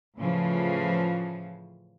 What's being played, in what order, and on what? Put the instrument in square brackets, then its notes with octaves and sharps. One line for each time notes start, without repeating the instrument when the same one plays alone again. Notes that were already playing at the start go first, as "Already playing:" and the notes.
[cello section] A2 C#3 E3 F3